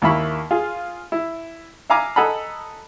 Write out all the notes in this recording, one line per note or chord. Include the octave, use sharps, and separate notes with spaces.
D#2 A#3 E4 B5 C#6
F4 G#4
E4
E5 F5 G#5 A#5 D6
A4 D#5 F#5 G#5 A#5 B5